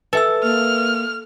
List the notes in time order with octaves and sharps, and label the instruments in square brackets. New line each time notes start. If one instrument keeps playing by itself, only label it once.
[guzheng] A4 [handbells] B4 E5 E6
[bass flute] A#3 [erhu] F6